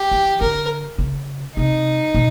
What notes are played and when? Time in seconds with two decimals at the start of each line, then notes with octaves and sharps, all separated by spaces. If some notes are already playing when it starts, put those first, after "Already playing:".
Already playing: G4
0.11 E3
0.41 D3 A#4
0.98 C#3
1.57 C3 D#4
2.15 B2